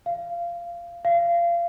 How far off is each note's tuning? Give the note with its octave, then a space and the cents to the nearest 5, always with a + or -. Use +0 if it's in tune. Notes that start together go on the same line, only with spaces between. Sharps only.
F5 -20
F5 -30